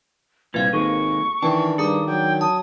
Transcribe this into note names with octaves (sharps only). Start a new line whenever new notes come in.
C2 A#2 G3 B4 F5 G#6
G#1 D#3 G#3 A#3 A4 C#6
D#3 E3 D4 G5
G2 G#4 A#5 D6 D#6
F#3 G5
A5 D#6